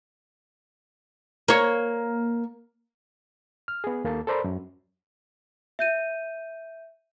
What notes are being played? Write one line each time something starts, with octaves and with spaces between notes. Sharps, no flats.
A#3 C#5
F6
B3 G#4
D#2 A#3 A4 A5
A4 A#4 C5 D5 A#5 B5
F#2
E5 G6 D#7